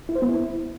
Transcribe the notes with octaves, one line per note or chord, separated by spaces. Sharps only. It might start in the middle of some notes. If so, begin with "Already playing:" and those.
E4
C5
B3
E4